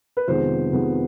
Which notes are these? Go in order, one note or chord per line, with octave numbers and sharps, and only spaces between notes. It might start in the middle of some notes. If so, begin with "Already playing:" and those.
B4
F2 C3 D#3 G#3 B3 C5
F2 C3 D#3 G#3 B3